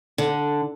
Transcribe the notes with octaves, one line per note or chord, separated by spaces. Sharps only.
D3